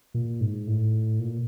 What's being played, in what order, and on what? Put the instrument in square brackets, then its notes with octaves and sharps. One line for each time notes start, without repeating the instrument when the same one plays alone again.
[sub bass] A#2
G#2
A2
A#2